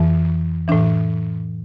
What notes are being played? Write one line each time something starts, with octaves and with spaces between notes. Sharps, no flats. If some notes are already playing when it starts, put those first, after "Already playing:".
Already playing: F2 E3
A2 E3 D4